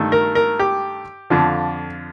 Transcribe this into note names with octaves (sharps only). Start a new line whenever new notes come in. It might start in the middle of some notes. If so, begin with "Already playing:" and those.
Already playing: G2 D#3 A3
A#4
A#4
G4
F2 D3 F3